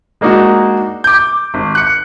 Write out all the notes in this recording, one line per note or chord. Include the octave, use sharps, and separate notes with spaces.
G#3 A#3 D4 D#4 F#4
D6 G6
G#1
F#6 C#7